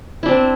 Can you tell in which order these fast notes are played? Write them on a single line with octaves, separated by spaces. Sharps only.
E4 D4 C4